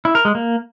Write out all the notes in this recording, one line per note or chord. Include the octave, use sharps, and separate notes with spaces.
E4
A#4
G#3
A#3